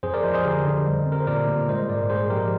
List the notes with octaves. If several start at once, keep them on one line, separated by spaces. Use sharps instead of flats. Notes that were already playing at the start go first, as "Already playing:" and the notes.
F2 G#4 C5
A#4 D5
F3 C5 D#5
G#4 C5
D3 G4 A#4
D3
G3
C4
A#4
C5
A#2 A#4 D5
A#2
G#3 C5 D#5
G#2 A#4 D5
G#3 G#4 C5
F3 G4 A#4